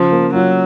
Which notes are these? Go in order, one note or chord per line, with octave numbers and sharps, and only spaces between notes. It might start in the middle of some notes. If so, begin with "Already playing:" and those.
Already playing: C#3 F3
A#3
F#3 F4